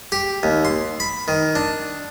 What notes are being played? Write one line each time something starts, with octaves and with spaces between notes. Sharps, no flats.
G4
D#2
C6
B5
D#3
D4